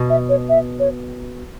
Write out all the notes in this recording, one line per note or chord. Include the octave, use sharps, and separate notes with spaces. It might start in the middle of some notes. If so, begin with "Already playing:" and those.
Already playing: B2
E5
C#5
E5
C#5